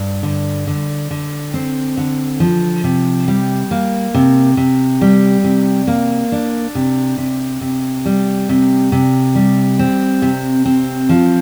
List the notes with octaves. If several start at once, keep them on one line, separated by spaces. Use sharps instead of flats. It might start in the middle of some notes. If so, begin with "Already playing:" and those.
Already playing: G2
D3
D3
D3
C4
D3
F3
C3
G3
A#3
C3
C3
G3
C3
A#3
D4
C3
C3
C3
G3
C3
C3
G3
C4
C3
C4
F3